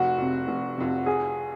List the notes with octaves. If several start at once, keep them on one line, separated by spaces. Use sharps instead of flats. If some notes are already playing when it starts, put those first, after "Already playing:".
Already playing: F1 F#4
F2 C3
F1
F2 C3
G#4